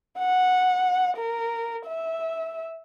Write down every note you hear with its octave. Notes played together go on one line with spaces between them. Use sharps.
F#5
A#4
E5